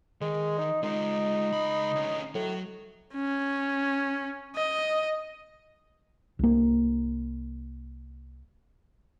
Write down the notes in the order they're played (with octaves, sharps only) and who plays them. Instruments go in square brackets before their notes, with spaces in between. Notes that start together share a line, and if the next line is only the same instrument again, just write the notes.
[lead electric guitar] D#3 [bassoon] G#3
[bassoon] D#4
[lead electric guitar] G#3 F4 [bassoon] D#4
[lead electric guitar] C#2 B5
D2 C#4
[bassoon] A2 [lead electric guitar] F#3
[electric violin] C#4
D#5
[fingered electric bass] C2 A#3